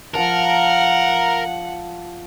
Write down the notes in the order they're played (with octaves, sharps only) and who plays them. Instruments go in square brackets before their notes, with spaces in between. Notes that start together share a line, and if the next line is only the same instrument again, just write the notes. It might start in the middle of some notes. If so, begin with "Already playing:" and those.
[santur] F3 A5 [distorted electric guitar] A#4 [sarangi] F#5